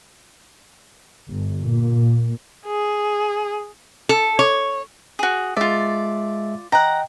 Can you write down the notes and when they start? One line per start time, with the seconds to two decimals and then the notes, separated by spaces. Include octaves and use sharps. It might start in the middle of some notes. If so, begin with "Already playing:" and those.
1.27 G1
1.64 A#2
2.66 G#4
4.09 A4
4.39 C#5
5.19 F#4 G#4
5.57 G#3 F4 D5 E5
6.72 D#5 F#5 G5 A#5